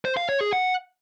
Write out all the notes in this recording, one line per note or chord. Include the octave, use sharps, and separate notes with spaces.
C5
F5
C#5
G#4
F#5